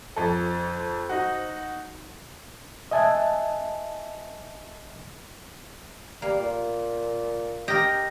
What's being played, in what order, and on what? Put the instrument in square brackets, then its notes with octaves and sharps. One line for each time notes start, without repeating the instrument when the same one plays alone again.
[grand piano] F2 A4 [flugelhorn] C5
[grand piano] D#4 F#4
[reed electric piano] D#5 E5 G#5 A5
[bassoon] G3 [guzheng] A#3
[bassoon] A#2
[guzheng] G4 A#4 [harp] D#5 A#6